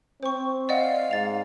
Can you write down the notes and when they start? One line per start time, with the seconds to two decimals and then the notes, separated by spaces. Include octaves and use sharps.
0.23 C4 C5 C#6
0.69 D5 D#5 F5 F#5
1.11 G#2 A6 F7